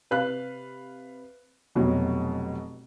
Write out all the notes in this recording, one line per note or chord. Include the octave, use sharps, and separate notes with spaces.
C3 B4 F5 F#6
F1 B2 F#3